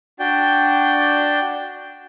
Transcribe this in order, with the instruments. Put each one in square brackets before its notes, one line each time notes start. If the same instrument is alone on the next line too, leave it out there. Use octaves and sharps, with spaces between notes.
[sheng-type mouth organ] D4 F#4 D5 G5